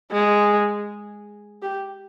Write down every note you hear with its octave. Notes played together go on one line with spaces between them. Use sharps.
G#3
G4